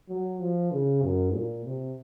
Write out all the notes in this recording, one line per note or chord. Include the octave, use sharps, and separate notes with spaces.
F#3
F3
C#3
F#2
A#2
C3